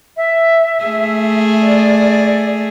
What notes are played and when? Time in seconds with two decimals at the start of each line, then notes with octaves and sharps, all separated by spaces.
0.16 E5
0.84 A3 G#4
1.61 D5